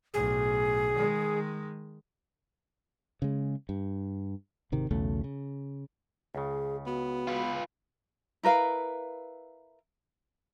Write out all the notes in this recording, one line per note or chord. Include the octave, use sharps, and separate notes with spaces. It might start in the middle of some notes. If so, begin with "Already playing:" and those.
B1 A2 G#4
D#3 G#3
C#3 G#3
G2
G#1 C3 D#3
B1 E2 C#3 A3
C#3
C#2 C#3 G#4
B3 F#4
F4 B4
E4 A#4 B4 F5